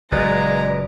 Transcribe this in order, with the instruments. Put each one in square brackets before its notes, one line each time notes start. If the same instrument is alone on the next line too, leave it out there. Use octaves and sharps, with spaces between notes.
[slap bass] F#1 F#2 A#2 [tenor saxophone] G#3 [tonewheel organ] B4 D5 [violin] A#5